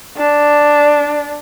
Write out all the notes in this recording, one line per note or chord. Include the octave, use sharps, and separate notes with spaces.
D4